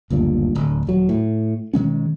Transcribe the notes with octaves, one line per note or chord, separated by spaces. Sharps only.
F#1 D2 G2 A#2
D1 D2
D#1 F#3
A2
B2 D#3 G#3 C#4